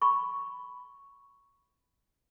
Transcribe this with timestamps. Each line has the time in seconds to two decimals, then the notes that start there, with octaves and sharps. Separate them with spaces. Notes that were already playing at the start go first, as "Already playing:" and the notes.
0.02 B5 C#6